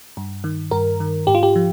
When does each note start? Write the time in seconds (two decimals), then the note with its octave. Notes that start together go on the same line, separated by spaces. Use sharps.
0.17 G2
0.44 D#3
0.71 G2 A#4
1.00 D#3
1.27 G#2 G4
1.35 F4
1.43 G4
1.56 F3